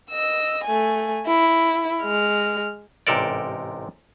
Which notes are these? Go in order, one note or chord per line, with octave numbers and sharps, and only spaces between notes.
D#5 E6
A3 G#5
E4
G#3 F6
A1 G#2 C3 A4 A#4 D5